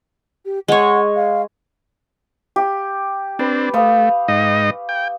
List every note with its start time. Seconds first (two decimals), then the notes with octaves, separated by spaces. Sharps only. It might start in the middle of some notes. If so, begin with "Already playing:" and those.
0.45 G4
0.68 G#3 C#5 F#5
1.16 F5
2.56 G4
3.39 C4 D4 B4
3.74 A3 F5 C#6 D#6
4.28 G#2 D#4 D#5
4.89 G5